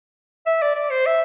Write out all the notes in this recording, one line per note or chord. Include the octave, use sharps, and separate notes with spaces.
E5
D5
D5
C5
E5